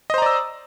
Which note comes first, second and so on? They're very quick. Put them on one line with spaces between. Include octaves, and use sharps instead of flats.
D#5 C5 A#5 D5 E6